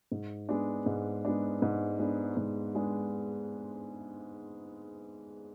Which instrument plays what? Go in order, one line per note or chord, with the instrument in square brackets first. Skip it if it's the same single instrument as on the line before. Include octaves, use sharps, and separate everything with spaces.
[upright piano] G#2
G#3 B3 D4
G#2
G#3 B3 D4
G#2
G#3 B3 D4
G#2
G#3 B3 D4